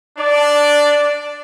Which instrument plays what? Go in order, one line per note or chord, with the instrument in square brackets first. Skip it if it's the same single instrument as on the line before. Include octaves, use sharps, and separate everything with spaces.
[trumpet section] D4 D5